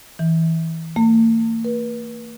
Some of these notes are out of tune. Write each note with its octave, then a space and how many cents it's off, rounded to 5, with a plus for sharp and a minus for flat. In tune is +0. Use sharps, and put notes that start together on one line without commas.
E3 -20
A#3 -45
B4 -40